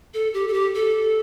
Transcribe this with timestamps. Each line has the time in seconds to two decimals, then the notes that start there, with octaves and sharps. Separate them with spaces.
0.14 A4
0.34 G4
0.48 A4
0.54 G4
0.75 A4